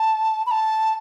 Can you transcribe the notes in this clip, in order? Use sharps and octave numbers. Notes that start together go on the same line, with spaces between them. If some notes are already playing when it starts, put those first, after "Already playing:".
Already playing: A5
B5
A5